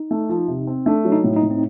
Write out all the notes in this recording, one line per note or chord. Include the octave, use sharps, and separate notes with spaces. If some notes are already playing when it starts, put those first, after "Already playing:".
Already playing: D#4
A3
F3
C3
C4
A3 D4
F#3
D#4
A2
D#4
A2
C4